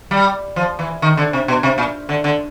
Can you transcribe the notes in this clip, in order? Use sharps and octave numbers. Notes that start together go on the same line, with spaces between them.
G3
F3
E3
D#3
D3
C3
B2
C3
A#2
D3
D3